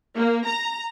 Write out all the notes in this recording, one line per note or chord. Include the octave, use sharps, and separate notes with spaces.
A#3
A#5